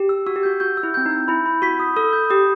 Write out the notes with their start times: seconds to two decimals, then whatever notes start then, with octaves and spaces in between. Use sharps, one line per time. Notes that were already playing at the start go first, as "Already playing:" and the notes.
Already playing: G4
0.09 E6
0.27 F#4 E6
0.36 G4
0.43 F#4 G6
0.60 F#4 G6
0.77 E6
0.83 E4
0.94 C4 G6
1.06 D#4
1.11 E6
1.28 E4 B5
1.46 B5
1.62 F#4 B6
1.80 D#6
1.97 A4 D#6
2.13 G6
2.30 G4 D#6